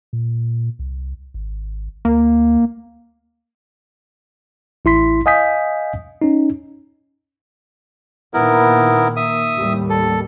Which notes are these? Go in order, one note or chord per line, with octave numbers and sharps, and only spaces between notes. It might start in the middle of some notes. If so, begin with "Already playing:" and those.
A#2
C2
G#1
D2 A#3
A1 E4 C6 B6
D#5 F5 G#5 D#6 G6 B6
C#4 D#4
A#2 D#3 A#3 B3 E4 A#4
E5 D#6
D#2 A2 G3
A4